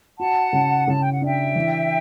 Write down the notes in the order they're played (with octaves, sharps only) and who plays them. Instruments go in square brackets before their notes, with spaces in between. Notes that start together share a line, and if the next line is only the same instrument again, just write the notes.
[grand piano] F#4 [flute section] F#5 A5
[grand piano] C#3
[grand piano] C#3 [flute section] A5
[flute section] G5
F#5
[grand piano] D4 [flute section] E5 G5
[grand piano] E3